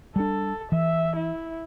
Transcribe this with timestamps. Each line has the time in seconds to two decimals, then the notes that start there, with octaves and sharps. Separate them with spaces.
0.16 G3 D4 A4
0.72 E3 E5
1.16 E4